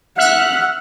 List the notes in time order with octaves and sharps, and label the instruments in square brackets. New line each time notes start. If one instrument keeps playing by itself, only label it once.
[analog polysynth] E5 F6 F#6 [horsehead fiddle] F#5